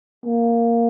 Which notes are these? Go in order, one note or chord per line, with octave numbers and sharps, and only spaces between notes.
A#3